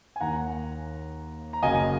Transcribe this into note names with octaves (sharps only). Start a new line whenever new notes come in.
G#5
D#2 D#3 A#3 F#5 A#5
A#5
F#1 F#2 C#3 A#3 D#5 G#5